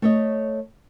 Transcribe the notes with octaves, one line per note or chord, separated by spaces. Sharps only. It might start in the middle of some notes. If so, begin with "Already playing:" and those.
A3 C#5 D#5